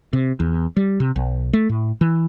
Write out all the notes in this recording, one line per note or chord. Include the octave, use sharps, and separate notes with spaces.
C3
E2
G3
C3
B1
A3
A2
E3